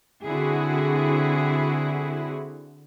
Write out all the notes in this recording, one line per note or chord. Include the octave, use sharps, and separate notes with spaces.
D3 C4 E4 F#4 G#4